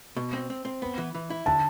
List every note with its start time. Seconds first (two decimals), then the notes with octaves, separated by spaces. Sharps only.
0.17 B2
0.33 C4
0.50 C4
0.65 C4
0.82 B3
0.98 E3
1.15 E3
1.30 E4
1.46 D3 A5